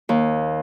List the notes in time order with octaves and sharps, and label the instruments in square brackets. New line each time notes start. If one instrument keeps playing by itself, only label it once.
[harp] D#2